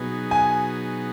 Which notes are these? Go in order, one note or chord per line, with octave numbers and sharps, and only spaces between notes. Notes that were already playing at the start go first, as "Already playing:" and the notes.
Already playing: B2 F#3 B3 D#4 G#4
G#5